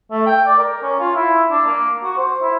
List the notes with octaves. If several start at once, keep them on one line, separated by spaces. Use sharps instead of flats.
A3
G5
D5
A#4
C#4
F4
E4
D4
A#3
F#4
C5
E4